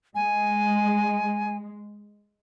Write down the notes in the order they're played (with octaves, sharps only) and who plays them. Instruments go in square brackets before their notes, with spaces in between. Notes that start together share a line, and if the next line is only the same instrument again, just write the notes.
[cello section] G#3 [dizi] G#5